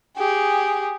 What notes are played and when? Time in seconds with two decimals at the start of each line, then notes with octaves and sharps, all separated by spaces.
0.17 G4 G#4